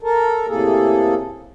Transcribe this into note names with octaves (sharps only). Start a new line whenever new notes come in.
A4 A#4
A2 C3 A#3 G#4 A4